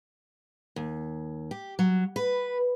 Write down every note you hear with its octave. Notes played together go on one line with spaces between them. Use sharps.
D#2
G4
F#3
B4